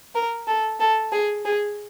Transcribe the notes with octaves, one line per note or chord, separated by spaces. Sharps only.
A#4
A4
A4
G#4
G#4